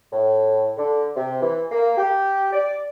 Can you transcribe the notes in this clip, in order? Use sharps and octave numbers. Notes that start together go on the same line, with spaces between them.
A2
D3
C3
E3
A#3
G4
D5